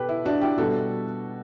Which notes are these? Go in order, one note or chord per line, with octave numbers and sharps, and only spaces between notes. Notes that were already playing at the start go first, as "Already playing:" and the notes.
Already playing: B2 G4 A4 B4
E4
D4 F#4
E4 G4
B2 G3 F#4 A4